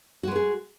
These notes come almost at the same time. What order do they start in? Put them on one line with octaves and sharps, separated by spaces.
F#4 G#3 B4 G#4